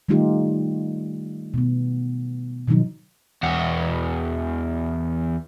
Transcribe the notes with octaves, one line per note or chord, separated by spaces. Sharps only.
D#3 G3 A3 D#4 F4 G4
B2 B3
B2 D#3 F3 F#3 D#4
E2 F#4